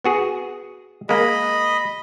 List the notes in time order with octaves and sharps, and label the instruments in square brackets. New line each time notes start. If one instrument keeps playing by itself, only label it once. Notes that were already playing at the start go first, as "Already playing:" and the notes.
[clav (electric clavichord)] B3 F#4 G#4
[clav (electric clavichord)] G#3 A#3 [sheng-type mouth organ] D#5 B5